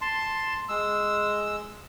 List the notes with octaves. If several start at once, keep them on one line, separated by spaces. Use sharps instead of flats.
A5 C6
G#3 E6